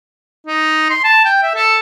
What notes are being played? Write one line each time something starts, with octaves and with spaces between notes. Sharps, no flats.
D#4
C6
A5
G5
E5
A4